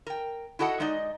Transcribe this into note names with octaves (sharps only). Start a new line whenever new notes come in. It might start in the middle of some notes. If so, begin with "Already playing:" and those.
A#4 G5
E4 F#4 A4 D#5 F#5
G#3 D#4 D5 D#5